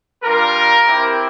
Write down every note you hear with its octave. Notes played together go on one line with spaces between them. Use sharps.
G3 D4 F4 A#4
C4 E4 G4